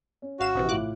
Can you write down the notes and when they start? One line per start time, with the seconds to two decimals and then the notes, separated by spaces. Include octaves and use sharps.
0.22 C#4
0.40 G#1 F#4 F5 E7
0.55 A#1 C3 E3 D#6 F6
0.69 A2 F4 D6 F#6